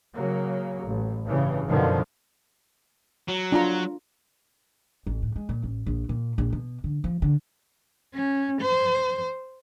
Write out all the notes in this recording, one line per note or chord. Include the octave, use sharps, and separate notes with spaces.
C#3 F#3 A#3
A1
G2 C#3 E3
F#2 B2 D3 D#3 F3
F#3
D4 F4 A#5
A1
A2
G#3
A#2
A1
A#1
A#2
A#1
B2
D3
F3
D3
C#4
C5